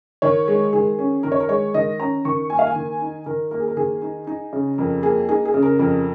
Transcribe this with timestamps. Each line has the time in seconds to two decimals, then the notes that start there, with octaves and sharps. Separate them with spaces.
0.22 D#3 C#5
0.48 G#3
0.73 D#3 G#4
0.99 C#4
1.23 D#3 A#4
1.32 C#5
1.40 A#4
1.49 G#3 C#5
1.74 D#3 D#5
2.00 C#4 A#5
2.25 D#3 C#6
2.50 A#3 G#5
2.59 F5
2.67 G#5
2.76 D#3
3.01 D#4
3.26 D#3 A#4
3.51 A#3 A#4
3.60 G#4
3.68 A#4
3.77 D#3 G#4
4.02 D#4
4.27 D#4
4.53 C#3
4.78 F2 A#4
5.03 A#3 G#4
5.29 D#4 G#4
5.45 G#4
5.54 C#3
5.63 A#4
5.79 F2 A#4